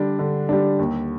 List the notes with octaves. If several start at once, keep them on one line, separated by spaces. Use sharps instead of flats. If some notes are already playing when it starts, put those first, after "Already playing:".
Already playing: D3 G3 D4
D3
G3 D4
D#2